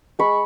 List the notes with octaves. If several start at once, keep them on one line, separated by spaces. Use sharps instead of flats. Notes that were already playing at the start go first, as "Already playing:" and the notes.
G#3 B5 C#6